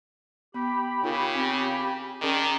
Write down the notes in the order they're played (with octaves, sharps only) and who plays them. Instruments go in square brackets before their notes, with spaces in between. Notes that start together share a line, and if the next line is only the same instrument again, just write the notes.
[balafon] B3 [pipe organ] G4 B5
[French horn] C#3 [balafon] D#4 F4 A#4
[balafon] C4
[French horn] D#3 [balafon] C#4 G#4 A#4 [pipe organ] D5